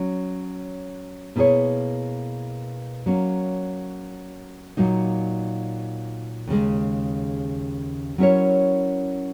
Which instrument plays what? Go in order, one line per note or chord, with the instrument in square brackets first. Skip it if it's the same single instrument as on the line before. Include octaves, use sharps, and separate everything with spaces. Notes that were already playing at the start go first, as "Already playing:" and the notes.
Already playing: [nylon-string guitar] F#3 C#4
B2 A#3 E4 G#4 C#5
F#3 A#3 C#4
A#2 F#3 A#3 D#4
D#2 C#3 G#3
F#3 C#4 E4 A#4 C#5